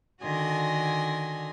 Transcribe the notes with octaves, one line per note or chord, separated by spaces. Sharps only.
D3 D#3 F#4 G#5 C6 D#6